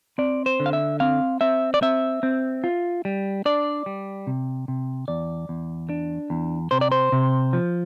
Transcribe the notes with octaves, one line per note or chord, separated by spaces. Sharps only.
C4 D5
C5
D3
F5
E5
C4 F5
C4 E5
D5
C4 E5
C4
F4
G3
D4 D5
G3
C3
C3
E2 D5
E2
D4
E2
C3 C5
D5
C5
C3
F3